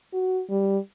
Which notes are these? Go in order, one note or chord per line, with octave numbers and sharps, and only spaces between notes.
F#4
G3